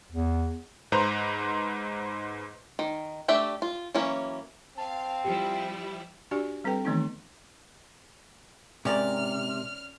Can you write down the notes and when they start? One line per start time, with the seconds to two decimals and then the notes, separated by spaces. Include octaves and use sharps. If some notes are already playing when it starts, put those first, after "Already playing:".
0.12 E2
0.92 G#2 B4 C5 A#5
2.79 D#3
3.28 A3 D4 G4 E5
3.62 F4
3.95 E3 F#3 A#3 C#4
4.77 C4 F5 A5
5.25 F3 G3 E4 G4
6.31 D4 F#4 G4 D5 G#5
6.64 G3 C4 A4 B4 G5
6.85 D#3 E3 A3 B3 C4 D#4
8.85 G#2 C3 C#4 A#4 D5 F6